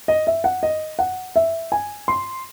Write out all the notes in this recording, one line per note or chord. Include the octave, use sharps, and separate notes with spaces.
D#5
E5
F#5
D#5
F#5
E5
G#5
C6